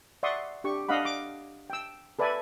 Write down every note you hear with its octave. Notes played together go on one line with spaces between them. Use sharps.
D5 E5 F#5 C6 C#6 D#6
D4 G4 C#6
D4 D#5 F5 F#5 B5
D6
G5 E6
A4 B4 D5 E5 G#5